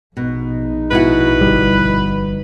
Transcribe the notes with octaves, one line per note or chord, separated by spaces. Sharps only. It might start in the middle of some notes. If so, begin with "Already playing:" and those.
A#1 B2 D#4
B2 E4 F#4 B4
G1 G3